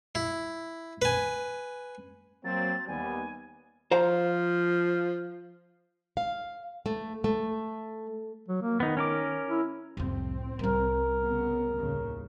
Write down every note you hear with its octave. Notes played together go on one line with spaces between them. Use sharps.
E4
B4 G#5
F#3 A#3 C4 A6
D#2 G3 B3 G#5
F3 C5 F5 A#5
F5
A3
A3
F#3
A#3
D#3 B3 D#4
C#4 A#4 D6
E4
C2 F2 A2 C4
C2 G3 A#4
C#3 B3
D#2 A2 C#3